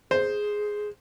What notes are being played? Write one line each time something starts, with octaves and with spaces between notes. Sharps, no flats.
G#4 C5